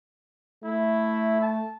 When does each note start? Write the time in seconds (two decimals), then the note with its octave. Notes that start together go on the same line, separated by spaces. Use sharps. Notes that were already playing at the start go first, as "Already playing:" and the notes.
0.64 A3 E4
1.41 A5